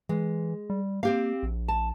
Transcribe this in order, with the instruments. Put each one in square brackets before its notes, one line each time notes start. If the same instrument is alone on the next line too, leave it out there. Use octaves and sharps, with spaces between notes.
[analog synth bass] E3 [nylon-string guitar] G#3
[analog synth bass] G3
[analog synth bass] A#3 [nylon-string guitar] C4 G4 F5
[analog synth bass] A#1
[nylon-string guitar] A5